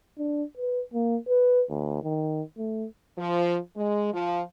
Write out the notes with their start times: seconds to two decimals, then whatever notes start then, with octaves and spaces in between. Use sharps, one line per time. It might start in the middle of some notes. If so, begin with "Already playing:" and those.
0.18 D4
0.57 B4
0.94 A#3
1.29 B4
1.70 D2
2.03 D#3
2.57 A3
3.17 F3
3.75 G#3
4.13 F3